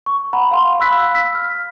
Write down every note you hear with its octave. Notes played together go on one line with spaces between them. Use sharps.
C#6
F#5 A#5 B5
F5 C6
F5 B5 E6 F#6 B6
E6 B6
F6